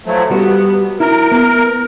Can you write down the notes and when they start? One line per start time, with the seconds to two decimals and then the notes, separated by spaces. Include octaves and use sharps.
0.06 F3 F#3 A3
0.31 G3 B3 F#4
1.00 E4 A#4
1.32 B3